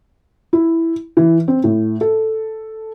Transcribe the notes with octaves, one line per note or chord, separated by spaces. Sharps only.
E4
E3
C4
A2
A4